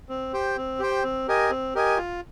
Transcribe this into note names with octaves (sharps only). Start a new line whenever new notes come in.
C4
G4 C5 G5
C4
G4 C5 G5
C4
G4 A#4 D#5 G#5
C4
G4 A#4 D#5 G#5
F4